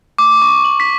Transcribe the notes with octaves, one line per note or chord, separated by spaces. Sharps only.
D6
C#6
F#7
B6